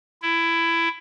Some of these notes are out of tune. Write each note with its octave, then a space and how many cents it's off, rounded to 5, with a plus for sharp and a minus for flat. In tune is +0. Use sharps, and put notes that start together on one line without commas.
E4 +15